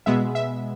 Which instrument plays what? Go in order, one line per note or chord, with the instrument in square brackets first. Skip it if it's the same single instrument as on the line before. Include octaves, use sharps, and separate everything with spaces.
[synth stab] B2 G#3 B3 E5
E5